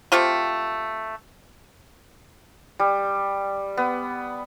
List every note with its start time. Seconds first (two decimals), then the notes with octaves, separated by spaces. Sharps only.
0.12 A3 C4 F4 G4
2.79 G3
3.78 B3